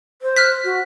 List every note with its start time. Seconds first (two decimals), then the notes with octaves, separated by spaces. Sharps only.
0.22 C5
0.36 F6 F#6 B6
0.64 F#4